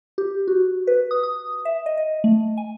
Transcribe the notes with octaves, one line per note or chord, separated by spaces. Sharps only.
G4
F#4
B4
D#6
D#6
E5
D#5
D#5
A3
G#5